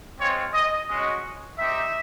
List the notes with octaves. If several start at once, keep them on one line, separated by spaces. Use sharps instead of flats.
G#3 C4 F4 C#5
D#5
G#3 C#4 F#4 D#5
C4 D#4 G4 E5